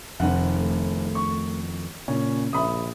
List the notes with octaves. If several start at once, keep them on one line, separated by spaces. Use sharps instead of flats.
F1 F2 D#3 F#5
A3
C#6
A#2 C#3 C#4
A#1 E5 B5 D#6